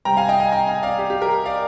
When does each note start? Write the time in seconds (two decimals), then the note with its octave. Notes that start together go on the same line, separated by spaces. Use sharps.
0.05 C3 G3 G5 A#5
0.17 F5 G#5
0.29 D#5 G5
0.40 F5 G#5
0.52 G5 A#5
0.67 F5 G#5
0.83 D5 F5
0.98 G4
1.10 G4
1.22 G4 A#4
1.46 D5 F5